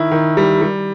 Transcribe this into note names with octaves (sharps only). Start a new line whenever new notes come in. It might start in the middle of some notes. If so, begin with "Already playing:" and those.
Already playing: D#3 E4
D#3
G3
G3